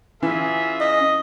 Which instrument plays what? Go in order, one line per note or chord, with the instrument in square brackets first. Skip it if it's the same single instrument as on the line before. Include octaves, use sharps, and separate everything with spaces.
[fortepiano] E3 [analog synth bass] C#4 [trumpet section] F4 G#4 E5
[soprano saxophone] D#5